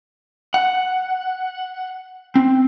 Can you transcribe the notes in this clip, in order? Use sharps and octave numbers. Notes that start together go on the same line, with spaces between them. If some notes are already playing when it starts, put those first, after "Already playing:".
F#5
C4